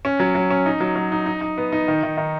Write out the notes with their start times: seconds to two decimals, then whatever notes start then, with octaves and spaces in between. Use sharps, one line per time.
0.05 C#4
0.20 F#3
0.35 F#3
0.50 C#4
0.66 D#4
0.80 F#3
0.96 F#3
1.12 D#4
1.26 D#4
1.41 D#4
1.58 B3
1.72 D#4
1.88 D#3
2.03 D#3
2.17 D#3